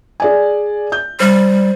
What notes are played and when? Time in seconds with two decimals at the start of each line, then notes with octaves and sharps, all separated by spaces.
0.20 G#4 D5 G#5
0.92 G6
1.20 G3 C5